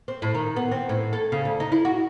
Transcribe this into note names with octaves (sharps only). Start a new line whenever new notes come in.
C4
A2
D#3
B3
C4
A2
A4
C#3
D2
D#4
E4
F#4